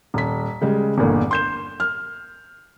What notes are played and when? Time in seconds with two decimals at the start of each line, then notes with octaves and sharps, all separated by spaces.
0.14 D#1 B6
0.62 C#3 G3 G#3
0.98 G1 E2 A#2 D3
1.31 C6 G6 E7
1.80 F6